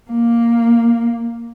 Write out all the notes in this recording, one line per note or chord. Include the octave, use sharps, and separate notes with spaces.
A#3